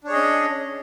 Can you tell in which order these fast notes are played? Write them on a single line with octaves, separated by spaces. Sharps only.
D4 C#5 G#4 D#5 C#4